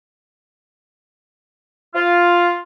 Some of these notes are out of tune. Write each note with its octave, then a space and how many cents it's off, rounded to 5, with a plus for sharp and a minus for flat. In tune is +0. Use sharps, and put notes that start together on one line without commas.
F4 +0